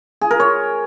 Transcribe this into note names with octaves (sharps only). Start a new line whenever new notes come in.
G#4
A#4
C#5